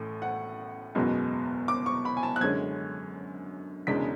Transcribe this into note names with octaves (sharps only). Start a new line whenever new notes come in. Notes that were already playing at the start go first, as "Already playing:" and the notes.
Already playing: A1 A2 A3
F#5
F#1 E2 B2 G#3 B3
D6
C#6
B5
G#5
A5
F#6
F#2 D3 G#3 C#4 G#6
E1 E2 C#3 G#3 D4 B6